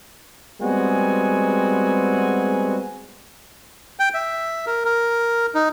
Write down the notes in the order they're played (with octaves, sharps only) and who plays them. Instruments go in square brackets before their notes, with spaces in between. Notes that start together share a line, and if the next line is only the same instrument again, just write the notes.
[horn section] G3 G#3 B3 C4 F#4 G#5
[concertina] G5
E5
A#4
A#4
D#4